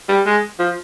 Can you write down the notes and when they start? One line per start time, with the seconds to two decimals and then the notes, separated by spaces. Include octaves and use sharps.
0.08 G3
0.26 G#3
0.59 F3